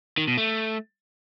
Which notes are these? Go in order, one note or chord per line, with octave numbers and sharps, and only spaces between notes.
D#3
B2
A3